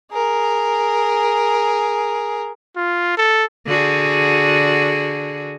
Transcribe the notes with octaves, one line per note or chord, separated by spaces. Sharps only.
G#4 A#4
F4
A4
D3 F#4 G#4